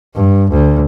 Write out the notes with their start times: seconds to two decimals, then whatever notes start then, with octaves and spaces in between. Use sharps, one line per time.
0.15 G2
0.51 D2